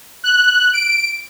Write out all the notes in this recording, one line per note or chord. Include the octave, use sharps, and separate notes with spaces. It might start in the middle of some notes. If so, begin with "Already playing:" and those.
F#6
D7